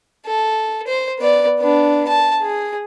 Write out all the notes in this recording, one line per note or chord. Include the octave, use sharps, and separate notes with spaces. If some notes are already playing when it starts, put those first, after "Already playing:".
A4
C5
B3 D5
B3 D4
A5
G#4